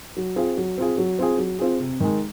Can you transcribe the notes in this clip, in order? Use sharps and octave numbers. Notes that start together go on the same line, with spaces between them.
F#3
C4 F4 G#4
F#3
C4 F4 G#4
F#3
C4 F4 G#4
F#3
C4 F4 G#4
C3
D#3 G#3